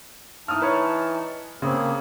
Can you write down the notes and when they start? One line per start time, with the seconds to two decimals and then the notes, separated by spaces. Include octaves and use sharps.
0.48 E3 D#4 A5 D#6 F6
0.62 B4 C#5
1.62 C#3 A#3 C4 G#4